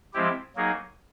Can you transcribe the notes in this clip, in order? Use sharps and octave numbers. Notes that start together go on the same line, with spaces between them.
F3 G#3 C4 E4 G4
F#3 A#3 D#4 G#4